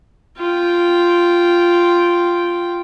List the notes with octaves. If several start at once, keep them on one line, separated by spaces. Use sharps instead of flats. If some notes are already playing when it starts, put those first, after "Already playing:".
F4 G5